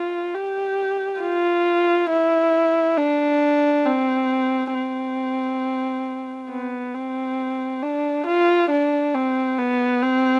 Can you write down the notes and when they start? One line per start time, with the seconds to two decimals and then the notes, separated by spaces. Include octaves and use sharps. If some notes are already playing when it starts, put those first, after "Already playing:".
Already playing: F4
0.34 G4
1.22 F4
2.10 E4
2.98 D4
3.86 C4
4.74 C4
6.50 B3
6.94 C4
7.82 D4
8.26 F4
8.70 D4
9.15 C4
9.58 B3
10.02 C4